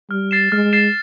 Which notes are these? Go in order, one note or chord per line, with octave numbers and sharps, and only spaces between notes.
G3 F6
A6 C7 E7
G#3 F6
A6 C7 E7